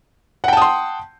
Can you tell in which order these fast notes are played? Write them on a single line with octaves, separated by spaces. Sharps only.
F#5 G5 A5 D#6 C6